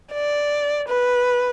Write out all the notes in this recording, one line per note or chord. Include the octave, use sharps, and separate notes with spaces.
D5
B4